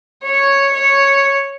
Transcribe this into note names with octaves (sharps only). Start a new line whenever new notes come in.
C#5
C#5